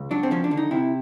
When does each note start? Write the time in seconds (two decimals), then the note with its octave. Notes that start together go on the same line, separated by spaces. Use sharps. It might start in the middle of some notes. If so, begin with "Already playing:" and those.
Already playing: C#2
0.11 F#3 D4
0.23 C4
0.31 F3 C#4
0.44 D4
0.51 D3
0.57 D#4
0.71 C3 E4